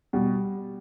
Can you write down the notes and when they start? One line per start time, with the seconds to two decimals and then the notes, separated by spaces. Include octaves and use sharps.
0.13 B2 G3